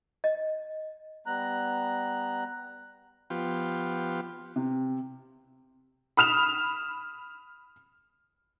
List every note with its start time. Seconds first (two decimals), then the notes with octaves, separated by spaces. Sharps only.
0.24 D#5
1.27 G3 B3 A#5 F#6
3.30 F3 B3 F4 G4
4.56 C3
6.17 B5 D#6 F6 E7 F7